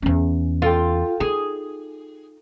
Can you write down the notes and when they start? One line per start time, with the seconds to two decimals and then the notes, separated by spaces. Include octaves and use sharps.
0.02 E2 C#4
0.62 F4 A4 G5
1.20 D#4 G#4